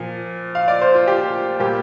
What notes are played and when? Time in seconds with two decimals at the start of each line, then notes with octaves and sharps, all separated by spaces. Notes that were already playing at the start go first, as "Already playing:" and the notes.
Already playing: A#2 F3
0.55 F5
0.68 D5
0.81 C5
0.95 F4
1.07 G4
1.60 A#2 G3 A#3 G4